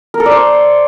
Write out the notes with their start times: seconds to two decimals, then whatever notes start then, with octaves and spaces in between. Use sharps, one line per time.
0.14 A#4
0.20 A4
0.26 D5
0.32 C5